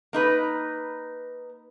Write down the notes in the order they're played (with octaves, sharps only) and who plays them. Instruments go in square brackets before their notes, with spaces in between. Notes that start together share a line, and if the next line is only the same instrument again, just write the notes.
[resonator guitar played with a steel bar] A#3 D#4 B4